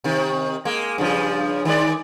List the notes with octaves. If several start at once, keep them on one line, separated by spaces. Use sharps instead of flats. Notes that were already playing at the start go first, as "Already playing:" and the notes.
C3 D#3
G#3 A#3
G2 C#3 F3
D#3 G#3 D5